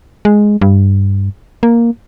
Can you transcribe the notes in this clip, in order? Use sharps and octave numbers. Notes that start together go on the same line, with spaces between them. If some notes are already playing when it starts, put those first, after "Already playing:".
G#3
G2
A#3